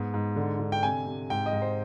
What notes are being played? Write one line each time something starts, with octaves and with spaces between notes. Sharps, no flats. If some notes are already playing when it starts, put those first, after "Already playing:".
Already playing: G#2 B3
G#2
D3
D3
G5
C3 G#5
C3
G#2 G5
D#5
G#2
C5